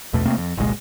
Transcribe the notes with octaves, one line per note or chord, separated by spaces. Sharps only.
A#1 E2 B2 A3
C3 A3 A#3 C4
F2
F#1 C2 A#2 G#3